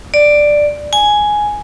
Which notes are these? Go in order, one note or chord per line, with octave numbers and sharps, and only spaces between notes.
D5
G#5